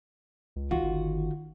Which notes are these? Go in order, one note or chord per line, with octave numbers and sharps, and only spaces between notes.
C#2
D#3 F4 F#4
G1